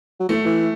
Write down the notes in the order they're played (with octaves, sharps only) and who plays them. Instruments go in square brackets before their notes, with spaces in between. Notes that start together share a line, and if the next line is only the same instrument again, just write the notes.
[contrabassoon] F#3
[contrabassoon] E3 [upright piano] A3
[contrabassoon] E3